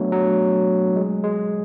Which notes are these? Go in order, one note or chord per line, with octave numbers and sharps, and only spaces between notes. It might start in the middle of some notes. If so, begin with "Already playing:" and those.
Already playing: F#3 A3 B3 D4
F#3
G#3
G#3